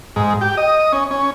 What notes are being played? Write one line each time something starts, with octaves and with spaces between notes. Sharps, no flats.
G#2
G4
D#5
C#4
C#4